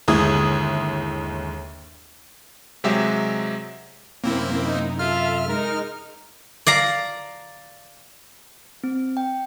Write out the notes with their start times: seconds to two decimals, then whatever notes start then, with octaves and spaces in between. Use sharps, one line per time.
0.08 G1 D#2 G#3 E4 D#6 G#6
2.84 C3 F#3 G#3 G4 E5
4.24 F#2 C3 A#3 C4 C#4 E4
4.65 D#4
4.99 F4 A4 E5 F6
5.49 G#3 D#4 A#4
6.67 D5 F5 A#5
8.84 C4
9.17 G5